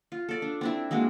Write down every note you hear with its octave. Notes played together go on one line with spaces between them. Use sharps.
F4
A4 D5
D4
C4 D4 E4
G#3 A#3 D4 F#4